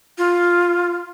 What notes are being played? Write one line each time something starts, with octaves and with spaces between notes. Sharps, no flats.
F4